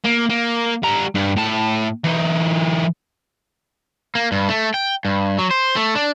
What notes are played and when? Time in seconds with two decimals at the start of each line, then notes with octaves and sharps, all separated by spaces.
0.04 A#3
0.29 A#3
0.83 G3 A#5
1.15 G2
1.36 A2 A5
2.04 E3 D#4
4.15 A#3
4.32 G2
4.49 A3
4.74 G5
5.05 G2
5.39 F#3
5.51 C5
5.76 A3
5.95 D4